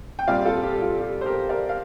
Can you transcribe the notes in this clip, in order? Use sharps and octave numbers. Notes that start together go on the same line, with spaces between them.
G5
A#2 G3 C4 D5 F5
F4 A4
G4
F4
G4
C5
G4 A#4
A#4 D5
F5